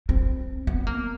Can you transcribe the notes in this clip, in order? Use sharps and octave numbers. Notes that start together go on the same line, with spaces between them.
C4
B3
A#3